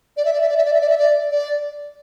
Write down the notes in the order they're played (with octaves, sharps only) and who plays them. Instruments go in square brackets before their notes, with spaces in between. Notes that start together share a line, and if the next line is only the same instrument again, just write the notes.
[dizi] D5
E5
D5
E5
D5
E5
D5
E5
D5
E5
D5
D5